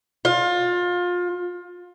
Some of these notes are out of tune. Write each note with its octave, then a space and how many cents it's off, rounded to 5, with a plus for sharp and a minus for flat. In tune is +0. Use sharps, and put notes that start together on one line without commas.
F4 +25